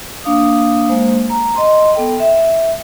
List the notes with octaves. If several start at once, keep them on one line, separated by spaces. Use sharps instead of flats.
A#3 D4 F5 D#6
G#3 A#3 C5
A#5
D#5 C6
B3 A4 G5
E5